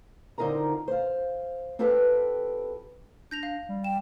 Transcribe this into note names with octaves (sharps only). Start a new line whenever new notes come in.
D3 C4 D#4 F4 A#4 A#5
C5 F5
C4 F4 G4 A4 B4 G5
D4 G6 A#6 F7
F5
G3
G5 E7